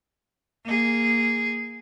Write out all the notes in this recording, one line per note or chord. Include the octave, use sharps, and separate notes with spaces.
A#3 G#4